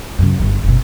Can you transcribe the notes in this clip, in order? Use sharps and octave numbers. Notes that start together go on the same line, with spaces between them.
F#2 C#3
G1 D3
F#1 B2